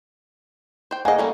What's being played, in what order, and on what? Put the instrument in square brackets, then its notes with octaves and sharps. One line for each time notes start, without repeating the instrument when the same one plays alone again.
[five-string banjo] C5 G5
[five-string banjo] A#3 D#5 [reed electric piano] G#4 F5 F#5 [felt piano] G#5
[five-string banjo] G3 A#3 C#4 [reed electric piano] A4